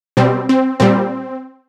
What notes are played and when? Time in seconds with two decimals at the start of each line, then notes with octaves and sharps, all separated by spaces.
0.17 B2 G3 C4
0.49 C4
0.80 A#2 G3 C4